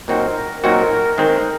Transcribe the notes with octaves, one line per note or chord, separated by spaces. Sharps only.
A#2 F#3 C4 D#4 F#4 A#4
A#2 F#3 C4 D#4 F#4 A#4
D#3 G#3 C4 A#4